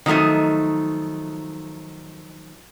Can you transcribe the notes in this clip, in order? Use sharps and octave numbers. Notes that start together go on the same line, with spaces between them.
D#3 F3 F#3 A3 D#4